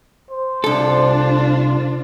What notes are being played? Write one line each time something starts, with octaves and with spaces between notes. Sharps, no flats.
C5
C2 D4 F4 A4